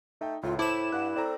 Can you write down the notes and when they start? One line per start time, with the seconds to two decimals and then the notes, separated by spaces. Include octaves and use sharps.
0.21 A3 D#4 G5
0.43 C#2 A2 F4
0.59 E4 C5 A5 D6 E7
0.92 G2 F#5 F#6
1.16 C4 A4 D5 A#5